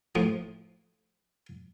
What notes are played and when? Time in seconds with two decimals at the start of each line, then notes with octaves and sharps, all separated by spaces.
0.15 A2 F3 D#6